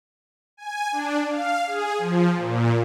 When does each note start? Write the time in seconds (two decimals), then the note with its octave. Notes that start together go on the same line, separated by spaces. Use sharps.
0.57 G#5
0.92 D4
1.29 F5
1.67 G#4
1.98 F3
2.36 A#2